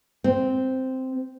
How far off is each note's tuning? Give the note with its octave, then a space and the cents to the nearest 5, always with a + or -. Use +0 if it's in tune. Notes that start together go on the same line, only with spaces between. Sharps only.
C4 -5